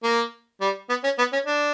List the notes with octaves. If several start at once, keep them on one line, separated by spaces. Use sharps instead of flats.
A#3
G3
B3
C#4
B3
C#4
D4